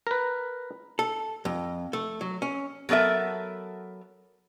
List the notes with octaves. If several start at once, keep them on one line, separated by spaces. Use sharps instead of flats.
A#4 B4
A4
F2
A3
F#3
C#4
F#3 B3 A4 A#4 E5